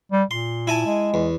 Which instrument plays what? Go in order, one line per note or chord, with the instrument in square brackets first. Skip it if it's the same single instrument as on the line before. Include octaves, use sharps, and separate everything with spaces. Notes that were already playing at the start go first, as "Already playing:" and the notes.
[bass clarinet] G3
[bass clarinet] A#2 [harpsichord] C6
[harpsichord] E4 G#5 A5
[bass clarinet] G#3
[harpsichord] E2